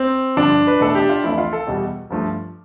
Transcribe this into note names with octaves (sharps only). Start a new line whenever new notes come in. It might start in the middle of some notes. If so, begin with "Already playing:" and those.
Already playing: C4
G2 D3 F3 D4
B4
E2 B2 A3 A4
G4
F4
F2 E3 A3 E4
F4
A4
E2 B2 G3
G2 F3 A3